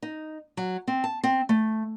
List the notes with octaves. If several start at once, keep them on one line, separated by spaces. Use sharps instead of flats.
D#4
F#3
C4
A5
C4
A3